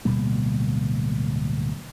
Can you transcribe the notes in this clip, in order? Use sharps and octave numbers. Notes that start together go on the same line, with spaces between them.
D1 B2 G3 A#3